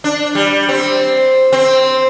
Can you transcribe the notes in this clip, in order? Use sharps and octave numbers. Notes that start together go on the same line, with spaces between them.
D4
G3
C4
C4